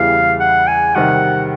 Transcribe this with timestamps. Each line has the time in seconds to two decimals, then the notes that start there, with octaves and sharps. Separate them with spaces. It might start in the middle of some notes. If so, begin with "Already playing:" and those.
Already playing: E2 C#3 E3 G3 F5
0.40 F#5
0.67 G#5
0.95 C3 D#3 G3 F#5